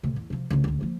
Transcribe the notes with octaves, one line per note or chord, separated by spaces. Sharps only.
A2 C3
E2
C3 F3
C#2 A3
D2 C#4
F3 A#3